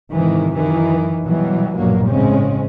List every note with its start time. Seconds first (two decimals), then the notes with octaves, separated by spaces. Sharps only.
0.12 G#2 C3 D#3 E3
0.54 F#2 D#3 E3
1.24 B2 E3 F#3 G3
1.75 A#1 G2 B2 F#3 A#3
2.08 A2 C#3 G#3 C4 C#4